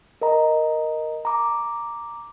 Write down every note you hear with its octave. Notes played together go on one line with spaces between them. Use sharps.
A#4 D#5 A#5
A#5 D6